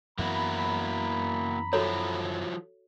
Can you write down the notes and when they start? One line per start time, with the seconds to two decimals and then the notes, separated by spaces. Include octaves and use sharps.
0.19 F#2 E3 A#3 B3 E4 F#4 A#5 B5
1.73 F3 F#3 E4 F#4 A4 C#5